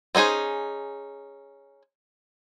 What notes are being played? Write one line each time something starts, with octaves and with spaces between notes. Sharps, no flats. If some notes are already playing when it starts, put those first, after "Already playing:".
C4 C#4 D#4 G#4 C5